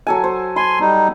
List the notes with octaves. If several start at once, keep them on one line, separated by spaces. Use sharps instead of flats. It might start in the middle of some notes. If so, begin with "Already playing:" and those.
F#3 A4 G#5
C5
G#5 B5 C6
G3 D#4